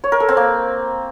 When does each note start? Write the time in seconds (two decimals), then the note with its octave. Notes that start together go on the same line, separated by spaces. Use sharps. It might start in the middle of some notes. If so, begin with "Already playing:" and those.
0.04 C#5
0.12 A#4
0.20 A4
0.29 C4
0.37 A#3